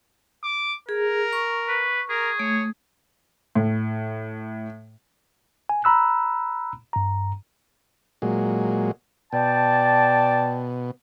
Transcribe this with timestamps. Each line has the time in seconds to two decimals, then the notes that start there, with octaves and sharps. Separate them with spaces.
0.44 D6
0.89 G#4 A#4
1.33 C#6
1.68 B4
2.10 G#4 A#4
2.39 A3 C#5
3.55 A2
5.69 G#5
5.84 A#5 B5 E6 F#6
6.93 G2 A#5
8.22 A#2 F#3 G#3
9.33 B2 D5 G5 A5